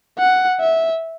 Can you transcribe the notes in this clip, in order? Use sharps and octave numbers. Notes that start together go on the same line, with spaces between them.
F#5
E5